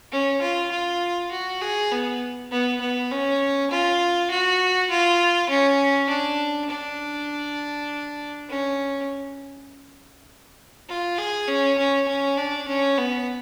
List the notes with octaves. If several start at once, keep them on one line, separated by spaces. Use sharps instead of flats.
C#4
F4
F4
F#4
G#4
B3
B3
B3
C#4
F4
F#4
F4
C#4
D4
D4
C#4
F4
G#4
C#4
C#4
C#4
D4
C#4
B3